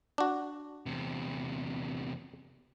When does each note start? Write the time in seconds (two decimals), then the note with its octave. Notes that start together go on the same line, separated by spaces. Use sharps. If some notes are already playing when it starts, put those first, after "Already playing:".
0.18 D4 F#4
0.86 E2 C3